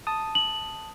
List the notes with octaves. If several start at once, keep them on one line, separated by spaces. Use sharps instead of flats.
A5 D#6
F#7